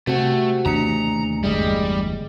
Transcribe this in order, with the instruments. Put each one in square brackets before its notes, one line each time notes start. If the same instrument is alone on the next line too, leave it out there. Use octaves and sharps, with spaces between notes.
[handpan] C3 C4 [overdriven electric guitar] A3 [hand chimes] F#4 F#5
[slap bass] D#2 C#3 E3 [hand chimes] A3 D4 C#7 [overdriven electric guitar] A#5
[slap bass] G1 E2 [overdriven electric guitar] G3 [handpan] G#3 D#5